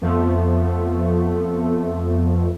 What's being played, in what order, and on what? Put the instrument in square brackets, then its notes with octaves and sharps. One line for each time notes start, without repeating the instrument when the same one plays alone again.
[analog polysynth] F2 F3 A3 B3